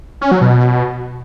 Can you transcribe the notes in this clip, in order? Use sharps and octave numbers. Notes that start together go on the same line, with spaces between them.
C#4
F#3
B2